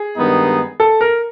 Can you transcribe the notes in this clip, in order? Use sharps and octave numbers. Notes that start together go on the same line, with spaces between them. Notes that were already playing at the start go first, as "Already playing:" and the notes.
Already playing: G#4
G2 D#3 G#3 B3 D#4
A4
A#4